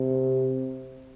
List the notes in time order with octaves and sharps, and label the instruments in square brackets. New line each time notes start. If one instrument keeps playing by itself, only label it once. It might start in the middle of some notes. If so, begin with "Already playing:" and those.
Already playing: [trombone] C3